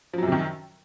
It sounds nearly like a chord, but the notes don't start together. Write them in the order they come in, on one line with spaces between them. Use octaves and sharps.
F3 F#3 F#2 C3 D#3